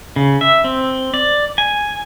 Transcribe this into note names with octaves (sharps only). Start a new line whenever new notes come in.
C#3
E5
C4
D5
G#5